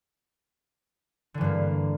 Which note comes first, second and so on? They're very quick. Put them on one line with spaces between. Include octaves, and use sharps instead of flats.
D3 E3 G2 A#3